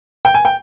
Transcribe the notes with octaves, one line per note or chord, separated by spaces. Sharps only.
G5
G#5
G5